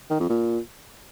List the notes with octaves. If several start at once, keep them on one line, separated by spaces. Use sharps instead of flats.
D#3
F2
A#2